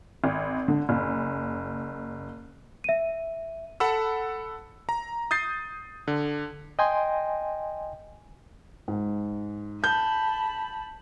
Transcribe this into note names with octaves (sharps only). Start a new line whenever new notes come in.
G#1
D3
F#1
E5 D#7
A4 F#5 B5 E6
A#5
D#6 G6 A6 C7
D3
D#5 G5 G#5 C6
G#2
A5 B5 G6